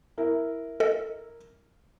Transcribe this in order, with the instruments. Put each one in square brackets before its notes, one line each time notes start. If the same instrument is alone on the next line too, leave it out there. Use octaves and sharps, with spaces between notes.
[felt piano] E4 A#4
[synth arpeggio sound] A4 D#5